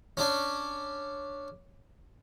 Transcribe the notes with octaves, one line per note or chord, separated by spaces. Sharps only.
C#4 D4